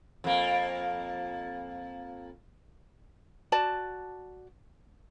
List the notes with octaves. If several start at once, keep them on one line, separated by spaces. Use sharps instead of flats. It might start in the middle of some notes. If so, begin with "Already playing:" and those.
F2 A#3
F#4 D5 A5